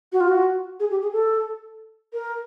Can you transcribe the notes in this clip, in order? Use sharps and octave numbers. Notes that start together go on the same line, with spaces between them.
F#4
F4
F#4
G#4
G4
G#4
A4
A#4